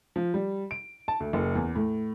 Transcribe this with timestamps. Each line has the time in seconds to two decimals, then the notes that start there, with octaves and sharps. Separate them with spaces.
0.16 F3
0.34 G3
0.71 D7
1.08 A5
1.20 D2
1.33 F#1
1.56 E2
1.75 A2